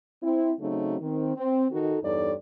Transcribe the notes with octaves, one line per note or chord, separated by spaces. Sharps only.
C4 E4
C#3 F#3 A3 C4 D#4
D#3 C4
C4
D#3 D#4 F#4 A4
E2 G2 D#4 A4 C#5 D5